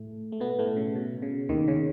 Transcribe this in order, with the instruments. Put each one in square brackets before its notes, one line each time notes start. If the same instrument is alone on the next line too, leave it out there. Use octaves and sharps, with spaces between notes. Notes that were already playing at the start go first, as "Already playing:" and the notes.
Already playing: [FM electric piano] A2 A3
A3
B2 B3
A2 A3
C#3
B2
C#3
D#2 D#3
C#3